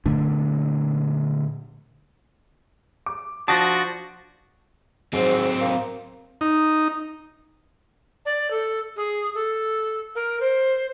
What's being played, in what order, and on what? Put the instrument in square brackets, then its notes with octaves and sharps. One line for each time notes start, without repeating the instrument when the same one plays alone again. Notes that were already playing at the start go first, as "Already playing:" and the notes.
[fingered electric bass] A#2 D3 A3 D4
[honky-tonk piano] D6
[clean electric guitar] F3 D4 [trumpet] F#4 [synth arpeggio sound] A5 [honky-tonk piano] D#6 A#6
[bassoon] G#2 [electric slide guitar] F#3 C4
[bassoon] A#3
[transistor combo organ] D#4
[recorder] D5
A4
G#4
A4
A#4
C5